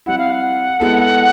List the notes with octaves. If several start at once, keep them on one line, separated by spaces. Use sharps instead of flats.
G3 C4 E4 F#5
F5
F#5
G#3 B3 E4 A4